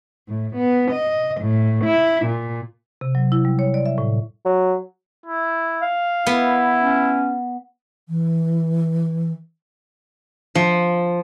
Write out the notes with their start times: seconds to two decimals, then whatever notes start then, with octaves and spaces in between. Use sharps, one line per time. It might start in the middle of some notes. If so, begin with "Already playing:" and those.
0.28 A2
0.56 B3
0.92 D#5
1.40 A2
1.84 E4
2.25 A#2
3.01 C3
3.15 F#3
3.32 E4
3.45 G3
3.59 C#5
3.74 D5
3.86 E5
3.98 A2
4.45 F#3
5.26 E4
5.82 F5
6.27 B3 E4
6.81 C#4
8.08 E3
10.55 F3